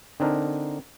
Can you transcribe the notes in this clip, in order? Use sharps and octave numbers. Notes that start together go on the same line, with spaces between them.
D3 C4 D4 D#4 A#4